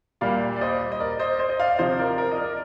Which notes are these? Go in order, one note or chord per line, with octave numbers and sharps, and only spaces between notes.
A#2 G3 D5 F5
D5
C5 D#5
D#5
A#4 D5
C5 D#5
C5 D#5
D#5
D5 F5
C3 F3 C5 D#5
A#4 D5
A#4 D5
D#5
A#4 D5